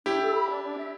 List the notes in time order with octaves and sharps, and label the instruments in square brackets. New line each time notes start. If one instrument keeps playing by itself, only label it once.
[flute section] D4 [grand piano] E4 G4
[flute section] A4
B5
D4
D4
E5